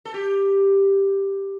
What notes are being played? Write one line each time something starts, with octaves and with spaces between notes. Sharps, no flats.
A4
G4